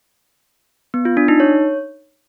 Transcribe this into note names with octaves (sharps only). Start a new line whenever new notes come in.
B3
F4
D4
D#4
C#5